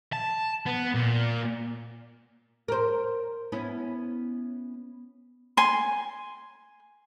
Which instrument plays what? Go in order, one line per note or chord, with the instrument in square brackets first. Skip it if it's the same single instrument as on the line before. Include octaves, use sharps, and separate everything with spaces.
[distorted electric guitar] A5
B3
A#2
[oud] A#4 C5
B3 C#4 E4
[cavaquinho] G#5 C6